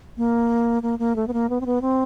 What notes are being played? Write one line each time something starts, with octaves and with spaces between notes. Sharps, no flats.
A#3
A#3
A#3
A3
B3
A#3
B3
C4
B3
C4